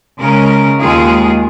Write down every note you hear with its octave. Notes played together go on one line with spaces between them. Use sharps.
C#3 G#3 C#4 A#4
D#2 D#3 G#3 F4 G#4